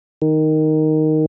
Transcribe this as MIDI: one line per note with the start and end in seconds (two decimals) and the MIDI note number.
0.22 1.26 51